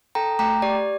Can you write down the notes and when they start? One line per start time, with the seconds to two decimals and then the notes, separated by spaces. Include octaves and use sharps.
0.15 A4 G5 A#5
0.39 A3 G5 A#5
0.62 G4 D5